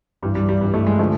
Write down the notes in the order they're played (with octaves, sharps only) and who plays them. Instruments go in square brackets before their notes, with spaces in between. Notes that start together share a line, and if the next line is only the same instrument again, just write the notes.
[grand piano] G2 E3 G3
G3
G3
G2 E3
A3
G#3
D3 F3 A3